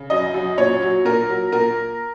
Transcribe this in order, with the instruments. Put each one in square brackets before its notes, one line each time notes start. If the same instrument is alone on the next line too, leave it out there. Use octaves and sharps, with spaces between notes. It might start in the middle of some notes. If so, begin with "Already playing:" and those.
Already playing: [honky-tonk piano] C#3
F#2 D#5
F#2
A#2 C#5
F#3
A#2 A#4
F#3
A#2 A#4